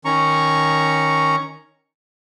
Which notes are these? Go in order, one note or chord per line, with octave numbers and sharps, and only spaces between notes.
D#3 C#4 A#5 C#6